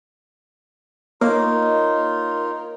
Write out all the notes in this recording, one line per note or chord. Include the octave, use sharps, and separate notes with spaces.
A#3 D#4 F4 A#4 C#5 D#5